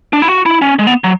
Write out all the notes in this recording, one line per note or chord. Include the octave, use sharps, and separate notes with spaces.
D4
E4
F#4
E4
C#4
G#3
B3
F#3